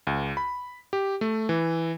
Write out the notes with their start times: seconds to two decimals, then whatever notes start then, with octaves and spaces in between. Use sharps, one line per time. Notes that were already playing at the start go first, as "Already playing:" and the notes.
0.07 C#2
0.37 B5
0.93 G4
1.21 A3
1.49 E3